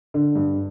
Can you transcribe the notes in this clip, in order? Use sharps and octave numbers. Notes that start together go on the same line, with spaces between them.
D3
G2